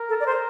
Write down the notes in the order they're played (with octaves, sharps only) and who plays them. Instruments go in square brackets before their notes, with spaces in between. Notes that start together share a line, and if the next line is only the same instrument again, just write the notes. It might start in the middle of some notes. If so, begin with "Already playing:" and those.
Already playing: [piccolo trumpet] A#4
[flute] A4
D5
C5